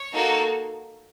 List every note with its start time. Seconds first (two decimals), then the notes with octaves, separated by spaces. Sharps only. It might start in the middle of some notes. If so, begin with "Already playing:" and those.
Already playing: C#5
0.12 A#3 D#4 F#4 A4